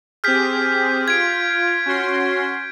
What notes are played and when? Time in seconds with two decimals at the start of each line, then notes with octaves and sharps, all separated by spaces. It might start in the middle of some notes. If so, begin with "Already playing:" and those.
0.24 C4 G4 G#4 F6 G6 B6
1.08 F4 G#6 D7
1.86 C#4 F#4 C6